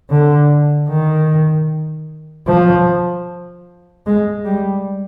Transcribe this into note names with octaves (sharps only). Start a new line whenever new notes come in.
D3
D#3
F3
G#3
G3